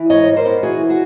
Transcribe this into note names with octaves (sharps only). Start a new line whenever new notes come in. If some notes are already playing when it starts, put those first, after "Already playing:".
Already playing: E3
G#2 C#5 D#5
G3
A#4 C5
B3
E3 F#4 G#4
F#4 G#4